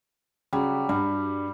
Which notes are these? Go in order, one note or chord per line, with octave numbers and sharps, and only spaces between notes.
C#3 F#3 G3
G2 G3